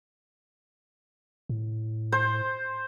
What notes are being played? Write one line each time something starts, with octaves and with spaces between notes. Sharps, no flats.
A2
C5